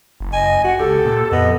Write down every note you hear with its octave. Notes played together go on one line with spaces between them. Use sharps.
F#1
D#5 G#5
F#4 F#5
C#2 G4 A4
A#2
F2 B3 D#5